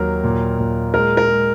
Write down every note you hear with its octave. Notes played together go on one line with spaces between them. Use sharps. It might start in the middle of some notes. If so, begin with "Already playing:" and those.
Already playing: D#2 F#3 A#4
A#2
A#2
G#3 A#4
A#4
G#3